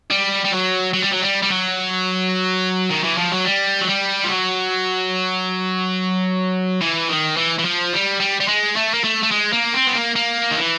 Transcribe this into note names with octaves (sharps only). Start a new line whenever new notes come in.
G3
G3
F#3
F#3
G3
F#3
G3
G3
F#3
D#3
E3
F3
F#3
G3
F#3
G3
F3
F#3
E3
D#3
E3
E3
F3
G3
G3
G3
G#3
A3
A#3
A3
A3
G#3
A#3
C4
B3
A#3
A#3
D#3
E3